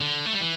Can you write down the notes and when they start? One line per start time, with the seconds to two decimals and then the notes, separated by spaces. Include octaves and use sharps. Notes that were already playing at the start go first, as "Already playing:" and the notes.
0.01 D3
0.26 A3
0.33 G3
0.41 E3